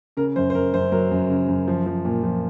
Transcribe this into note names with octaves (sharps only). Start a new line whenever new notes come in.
C#3 A#4
F#2 C5
C5
F#2 A#4
F#2 C5
F#3 A#4
F#2
C#3
F#2
F3
F3
A#2
F3